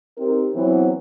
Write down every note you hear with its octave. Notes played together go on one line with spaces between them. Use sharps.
C4 D#4 G4 A#4
E3 F#3 B3 C4